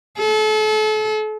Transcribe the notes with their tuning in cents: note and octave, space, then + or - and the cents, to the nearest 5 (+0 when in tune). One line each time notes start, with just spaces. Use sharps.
A4 -35